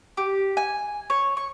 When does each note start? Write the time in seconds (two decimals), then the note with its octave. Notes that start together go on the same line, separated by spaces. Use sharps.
0.17 G4
0.57 G#5
1.10 C#5
1.37 C#6